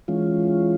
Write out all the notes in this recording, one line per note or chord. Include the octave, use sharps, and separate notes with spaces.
E3 G#3 C#4 F4